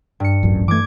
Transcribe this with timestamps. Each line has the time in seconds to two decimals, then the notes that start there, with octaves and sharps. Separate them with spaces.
0.20 G2 C#7
0.43 D1 A1 F#2
0.68 E3 A3 D6 G#6